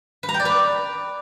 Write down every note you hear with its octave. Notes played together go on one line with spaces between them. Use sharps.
B4
A#5
G5
D5
B4